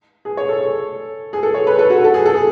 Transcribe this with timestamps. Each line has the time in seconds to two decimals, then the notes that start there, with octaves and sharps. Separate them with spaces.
0.25 G#4
0.37 C#5
0.49 A4
1.33 G#4
1.43 A4
1.54 C#5
1.67 B4
1.79 A4
1.90 F#4
2.04 A4
2.14 G#4
2.26 A4
2.34 G#4